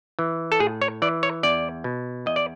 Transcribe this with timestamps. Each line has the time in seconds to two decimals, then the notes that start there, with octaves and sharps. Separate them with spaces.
0.19 E3
0.52 A4
0.60 A2 G#4
0.82 C#5
1.02 E3 D5
1.23 C#5
1.43 E2 D5
1.84 B2
2.26 E2 D#5
2.36 D5